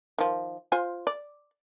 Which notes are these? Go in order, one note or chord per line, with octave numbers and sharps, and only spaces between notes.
D#3 F3
F4 C5 G#5
D5